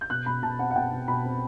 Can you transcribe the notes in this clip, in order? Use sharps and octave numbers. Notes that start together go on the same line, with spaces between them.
G6
B2 F#6
B2 B5
B2 A5
C4 F#5
F#5
B2 G5
B2
B2 B5
C4